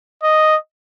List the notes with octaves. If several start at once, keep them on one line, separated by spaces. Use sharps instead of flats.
D#5